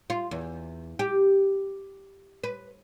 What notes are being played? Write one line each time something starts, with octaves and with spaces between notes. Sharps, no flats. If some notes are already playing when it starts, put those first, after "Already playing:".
F4
E2
G4
B4